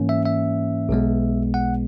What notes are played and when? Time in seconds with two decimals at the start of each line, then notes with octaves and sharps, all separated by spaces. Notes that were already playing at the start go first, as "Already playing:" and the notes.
Already playing: G#2 E3 A#3 C#4
0.09 E5
0.25 E5
0.89 B1 B2 G#3 B3
1.54 F#5